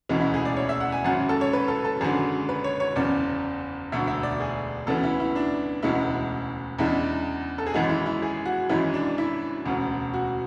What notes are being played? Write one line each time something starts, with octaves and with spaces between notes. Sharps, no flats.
E1 D2 C#3 E3 G#3
E4
G#4
D5
C#5
E5
F#5
G#5
G#1 F#2 C#3 F#5
A4
C#5
B4
A4
A4
G#1 F#2 D3 G#4
B4
C#5
C#5
F#1 E2 C#3 D5
E1 D2 D3 E5
E5
D5
G#4
D2 C#3 E3 B3 A4
E4
E4
D4
E1 D2 C#3 G#3 E4
E2 C#3 G#3 D4 E4
A4
G#4
G#1 F#2 E3 G#3 F#4
E4
E4
G#4
F#4
G#1 F#2 E3 G#3 E4
D4
E4
E1 D2 C#3
F#4